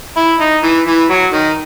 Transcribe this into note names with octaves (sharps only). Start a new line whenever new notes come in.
E4
D#4
E3
E3
F#3
D#3